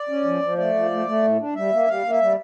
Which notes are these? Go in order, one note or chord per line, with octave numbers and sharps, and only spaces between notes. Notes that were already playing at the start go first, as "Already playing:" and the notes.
Already playing: D5
C#4
F3
F3
A3 D5
F3
A3
A3
A2
D4
G3 E5
A#3
G3 F5
A#3
E5
G3